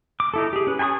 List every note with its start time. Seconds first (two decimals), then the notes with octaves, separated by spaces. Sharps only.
0.20 D6
0.34 D#4 E4 A4
0.53 G4 G#4
0.67 C#4 B4
0.79 G#5 A5 B5 C#6 D#6